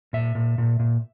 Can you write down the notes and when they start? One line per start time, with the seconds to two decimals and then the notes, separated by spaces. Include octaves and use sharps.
0.13 A#2 E5
0.35 A#2
0.58 A#2
0.80 A#2